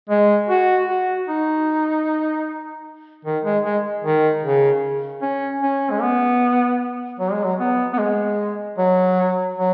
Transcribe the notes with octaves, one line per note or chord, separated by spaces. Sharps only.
G#3
F#4
F#4
D#4
D#3
G#3
G#3
D#3
C#3
C#4
C#4
G#3
B3
F#3
G#3
F#3
B3
B3
G#3
F#3
F#3